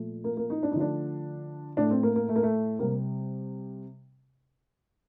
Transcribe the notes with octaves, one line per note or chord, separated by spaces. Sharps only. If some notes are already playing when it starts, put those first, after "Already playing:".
Already playing: A#2 F3 A3
A#3
A#3
D#4
D4
D#4
D3 F3 A3 D4
A2 A3 D4
C4
A#3
A#3
A3
A#3
A3
C3 G3 A#3